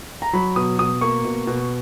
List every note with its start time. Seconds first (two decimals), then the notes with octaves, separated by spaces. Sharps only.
0.22 A#5
0.33 F#3 B5
0.56 B2 D#6
0.79 B2 D#6
1.01 A#3 C#6
1.25 B2
1.47 B2